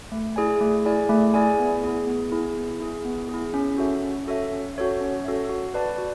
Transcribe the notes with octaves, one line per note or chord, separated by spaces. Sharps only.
A3
E4 G#4 D5 G#5
A3
E4 G#4 D5 G#5
A3
E4 G#4 D5 G#5
B3
E4 G#4
B3
E4 G#4
B3
E4 G#4
B3
E4 G#4
C#4
F#4 A4 C#5 E5
C#4
F#4 A4 C#5 E5
C#4
F#4 A4 C#5 E5
C#4
F#4 A4 C#5 E5
F#4
B4 D5 A5
F#4